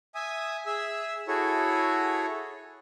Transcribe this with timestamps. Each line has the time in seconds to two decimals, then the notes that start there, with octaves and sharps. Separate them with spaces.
0.15 E5 G#5 D#6
0.66 G#4 E5 E6
1.28 E4 F#4 G#4 A4 C#5